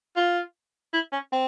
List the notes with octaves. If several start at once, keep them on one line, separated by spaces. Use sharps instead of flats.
F4
E4
C#4
C4